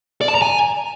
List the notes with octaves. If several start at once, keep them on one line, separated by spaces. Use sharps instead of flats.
D5
A5
A#5
G#5